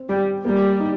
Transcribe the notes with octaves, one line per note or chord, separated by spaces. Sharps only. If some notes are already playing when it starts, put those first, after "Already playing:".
Already playing: C4
G3 G4
G3 A#3
D#4